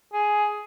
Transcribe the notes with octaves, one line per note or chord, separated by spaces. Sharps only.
G#4